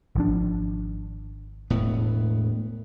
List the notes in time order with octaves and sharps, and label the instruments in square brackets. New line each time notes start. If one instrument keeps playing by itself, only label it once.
[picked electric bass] G#1 F3 D4
[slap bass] E1 A2 B3